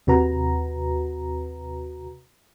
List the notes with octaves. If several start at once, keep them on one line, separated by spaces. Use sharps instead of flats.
D#2 C3 F#4 B4 A#5